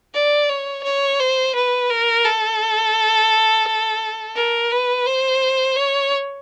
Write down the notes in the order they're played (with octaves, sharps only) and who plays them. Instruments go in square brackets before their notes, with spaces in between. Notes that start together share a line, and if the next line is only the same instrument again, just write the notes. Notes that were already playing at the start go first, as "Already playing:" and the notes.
[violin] D5
C#5
C#5
C5
B4
A#4
A4
A#4
B4
C5
C#5